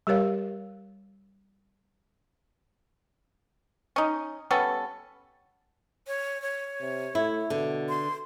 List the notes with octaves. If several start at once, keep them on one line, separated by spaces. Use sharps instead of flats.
G3 G4 A#4 C#5 F5
C#4 D#4
G3 B3 C#4 A4
C#5
C#5
C3
A3 E4
B2 D3
C6